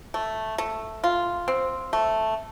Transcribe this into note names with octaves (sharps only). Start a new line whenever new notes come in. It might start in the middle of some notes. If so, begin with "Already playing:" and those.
A3
A3
F4
C4
A3